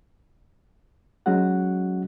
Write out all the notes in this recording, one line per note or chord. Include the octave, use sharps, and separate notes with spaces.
F#3 G#3 C#4 F#4 F#5